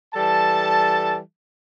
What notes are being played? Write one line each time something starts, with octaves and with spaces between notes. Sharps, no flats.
E3 G3 A4 A5